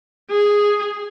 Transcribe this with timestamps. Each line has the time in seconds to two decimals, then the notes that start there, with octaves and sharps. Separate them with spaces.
0.31 G#4